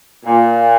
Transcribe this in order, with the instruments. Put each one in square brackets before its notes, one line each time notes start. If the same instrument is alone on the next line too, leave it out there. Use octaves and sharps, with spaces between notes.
[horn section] A#2